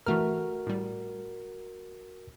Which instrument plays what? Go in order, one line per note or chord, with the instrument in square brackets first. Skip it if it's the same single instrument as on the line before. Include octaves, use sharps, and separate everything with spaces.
[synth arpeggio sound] E3 A3 F6 [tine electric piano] F#4 A#4
[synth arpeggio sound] A2 G3